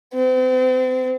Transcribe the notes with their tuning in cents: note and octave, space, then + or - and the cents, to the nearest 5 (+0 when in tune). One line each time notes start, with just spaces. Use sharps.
C4 -35